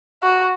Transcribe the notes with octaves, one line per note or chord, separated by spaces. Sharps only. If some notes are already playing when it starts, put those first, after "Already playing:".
F#4